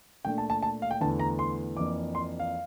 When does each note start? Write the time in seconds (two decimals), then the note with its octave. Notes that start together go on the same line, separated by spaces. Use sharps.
0.25 A#2 A3 D4 G5
0.38 A5
0.50 A5
0.63 A5
0.82 F5
0.91 G5
1.01 E2 D3 A3 E4 A5
1.19 A#5
1.39 C6
1.76 F2 E3 A#3 D4 D6
2.15 C6
2.40 F5